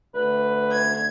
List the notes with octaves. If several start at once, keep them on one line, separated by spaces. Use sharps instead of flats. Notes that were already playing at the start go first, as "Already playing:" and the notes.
D2 B4
G#6